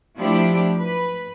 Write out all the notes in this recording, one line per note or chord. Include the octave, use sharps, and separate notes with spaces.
F3 A3 D4 E4 G4
B4